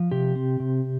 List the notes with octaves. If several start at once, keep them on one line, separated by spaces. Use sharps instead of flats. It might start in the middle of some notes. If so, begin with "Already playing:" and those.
Already playing: F3
C3 G4
C4
C3